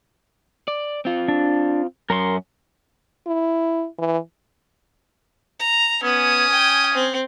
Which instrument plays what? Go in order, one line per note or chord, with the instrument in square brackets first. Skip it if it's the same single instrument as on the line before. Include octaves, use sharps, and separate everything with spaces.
[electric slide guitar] D5
C4 F4
[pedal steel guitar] D4
[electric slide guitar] F#2 C#4 [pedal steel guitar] A#4 C6
[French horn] E4
E3
[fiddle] A#5
[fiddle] B3 [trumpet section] C#4 G#5 D#6
[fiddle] G5
C4